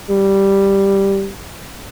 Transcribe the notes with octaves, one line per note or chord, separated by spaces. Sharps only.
G3